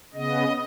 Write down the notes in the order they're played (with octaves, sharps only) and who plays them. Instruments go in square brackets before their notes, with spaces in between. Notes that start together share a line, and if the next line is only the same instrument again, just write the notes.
[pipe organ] C#3 B3 D#5